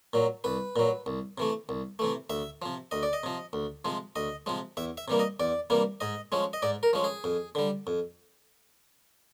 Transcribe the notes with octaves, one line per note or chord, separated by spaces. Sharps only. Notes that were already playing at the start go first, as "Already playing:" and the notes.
A#2 F#3
C2 B4
A#2 F#3
C2
C3 E3 A3
C2
C3 E3 A3
D2 E5
C3 F3
D2 D#5
D5
D#5
C3 F3
D2
C3 F3 G#3
D2 D#5
C3 F3 G#3
E2 E5
E5
C3 E3 G3 A#3
D#5
E2 D5
C3 E3 G3 A#3
G#2 D#5
F3 G#3 C#4
D#5
G#2 D5
A#4
F3 G#3 C#4
G#4
F2
D3 G3
F2